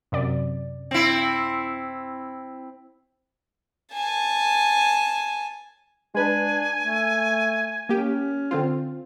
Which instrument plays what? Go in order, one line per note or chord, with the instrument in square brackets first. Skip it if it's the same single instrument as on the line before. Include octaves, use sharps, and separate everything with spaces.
[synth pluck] F#2 C3 D5
[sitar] C4 E4
[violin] G#5 A5
[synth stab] G#3 B4 [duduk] D4 [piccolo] G#5
[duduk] A3
[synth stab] A#3 G4 [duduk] C#4
[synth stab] D3 C4 F4